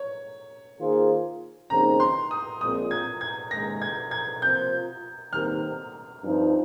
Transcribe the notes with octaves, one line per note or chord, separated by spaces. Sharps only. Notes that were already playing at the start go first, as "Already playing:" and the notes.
Already playing: C#5
D#3 A#3 F4 G#4 C5
D#2 C#3 F3 C4 D#4 A#5
C6
D#6
A#1 A#2 G#3 C4 F4 D#6
G#6
G#6
D#2 C#3 G#3 A#6
G#6
G#6
C3 F3 A#3 F4 C5 G6
D#2 D#3 G3 C4 G4 F6
G2 F3 C4 D#4